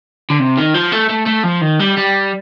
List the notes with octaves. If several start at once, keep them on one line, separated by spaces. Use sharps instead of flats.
D3
C3
D#3
F3
A3
A3
A3
F3
D#3
G3
G3